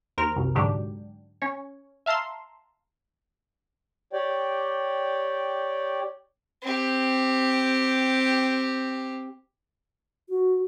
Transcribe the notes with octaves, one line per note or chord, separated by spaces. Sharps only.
D#2 A#4 C5 F6
C2 F#2
G#2 D3 F#3 D4 G4
C#4 C#5
E5 F5 A5 A#5 C6
G4 C#5 D5 G5
C4 G4
F#4